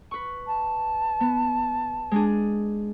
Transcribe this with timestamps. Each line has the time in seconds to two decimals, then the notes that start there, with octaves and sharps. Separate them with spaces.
0.11 B4 C#6
0.47 A5
1.20 B3
2.11 G#3 D4 G#4